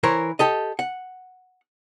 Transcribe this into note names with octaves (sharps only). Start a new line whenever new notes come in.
E3 A#4 C5 C#5
G4 A4 D#5
F#5